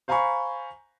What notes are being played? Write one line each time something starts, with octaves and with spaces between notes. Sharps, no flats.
C5 F5 G#5 A#5 B5 C#6